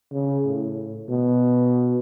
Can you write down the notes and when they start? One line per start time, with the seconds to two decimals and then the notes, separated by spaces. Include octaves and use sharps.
0.12 C#3
0.46 A2
1.09 B2